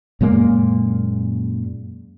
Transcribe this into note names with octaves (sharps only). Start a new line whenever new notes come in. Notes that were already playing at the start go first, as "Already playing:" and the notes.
F#2 A#2 G#3 A#3